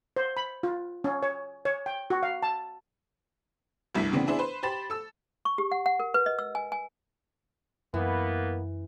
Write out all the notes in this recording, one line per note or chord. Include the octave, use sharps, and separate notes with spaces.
C5
B5
F4
C#4
C#5
C#5
G5
F#4
F5
A5
F1 C2 G2 E4 B6
C#3 E3 B3 C4 D4
B3 D4 E4 G#4 C5 E5
B4 C5
G4 C5 B5 A6 E7
A4 E6
C#6
G4
F#5
F#5
A#4
B4
D#5
E6
G#5
G#5
F#2 E3 A#3 B3